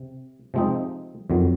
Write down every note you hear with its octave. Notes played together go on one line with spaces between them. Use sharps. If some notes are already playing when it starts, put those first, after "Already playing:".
Already playing: C3
C3 F3 G#3 C4 D#4
F2 D#3 F#3